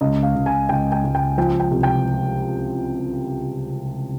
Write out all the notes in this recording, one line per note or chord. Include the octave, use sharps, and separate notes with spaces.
C#2 D#5
F5
C#2
G#5
C#2 G5
G5
C#2
G5
F3 G5
G5
C2
G5